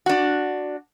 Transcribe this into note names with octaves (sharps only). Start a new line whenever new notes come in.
D4 F#4